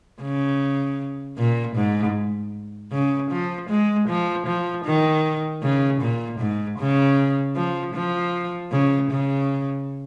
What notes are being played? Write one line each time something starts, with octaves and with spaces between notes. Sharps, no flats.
C#3
A#2
G#2
C#3
F3
G#3
F3
F3
D#3
C#3
A#2
G#2
C#3
F3
F3
C#3
C#3